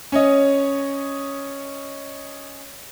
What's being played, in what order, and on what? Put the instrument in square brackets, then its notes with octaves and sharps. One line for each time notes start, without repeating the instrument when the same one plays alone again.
[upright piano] C#4 C#5 D#5